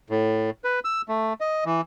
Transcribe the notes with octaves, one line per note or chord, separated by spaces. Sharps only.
A2
B4
E6
A3
D#5
E3